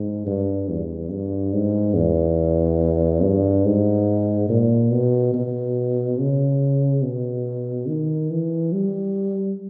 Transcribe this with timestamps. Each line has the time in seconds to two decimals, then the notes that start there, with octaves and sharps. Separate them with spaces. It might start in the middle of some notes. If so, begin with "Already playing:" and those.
Already playing: G#2
0.27 G2
0.69 E2
1.10 G2
1.53 G#2
1.96 E2
3.22 G2
3.65 G#2
4.49 A#2
4.91 B2
5.34 B2
6.18 C#3
7.03 B2
7.88 D#3
8.30 E3
8.73 G3